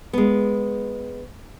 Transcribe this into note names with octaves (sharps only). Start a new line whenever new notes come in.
G#3 B3